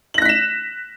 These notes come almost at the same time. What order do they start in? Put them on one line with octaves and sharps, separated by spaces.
F#7 A#6 F#6 B6 E7